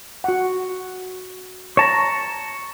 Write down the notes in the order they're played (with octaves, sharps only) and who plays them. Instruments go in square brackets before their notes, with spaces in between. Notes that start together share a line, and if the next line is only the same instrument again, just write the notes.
[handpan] F#4 F#5
[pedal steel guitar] C#5 A5 A#5